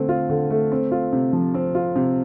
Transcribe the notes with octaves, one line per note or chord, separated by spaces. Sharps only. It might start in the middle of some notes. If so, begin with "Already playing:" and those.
Already playing: D3 A3 C4
F4
D3
A3
C4
F4
C3
F3
C4
F4
C3